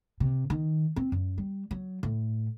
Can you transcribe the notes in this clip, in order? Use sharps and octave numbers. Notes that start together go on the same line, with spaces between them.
C3
D#3
C4
F#2
G3
F#3
A2